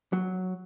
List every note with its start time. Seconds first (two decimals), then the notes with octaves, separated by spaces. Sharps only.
0.13 F#3